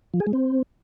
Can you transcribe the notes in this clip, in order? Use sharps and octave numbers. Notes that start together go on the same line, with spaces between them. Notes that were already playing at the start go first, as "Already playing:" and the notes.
F3
G#4
G#3
C4